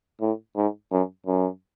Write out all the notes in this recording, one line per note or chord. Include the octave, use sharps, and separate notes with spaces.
A2
G#2
F#2
F#2